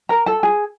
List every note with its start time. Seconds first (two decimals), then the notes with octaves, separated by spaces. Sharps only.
0.09 A#4 A#5
0.26 A4 A5
0.43 G#4 G#5